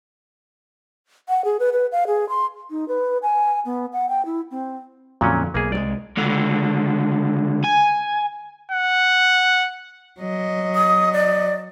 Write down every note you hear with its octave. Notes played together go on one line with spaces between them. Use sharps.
F#5
G#4
B4
B4
F5
G#4
C6
D#4
B4
G#5
B3
F#5
G5
E4
C4
F2 A#2 D3 F#3 C#4
B1 A#3 G#4
C2 F#3 G#3 D5
C#2 D3
G#5
F#5
F#3 D#5
D#6
D5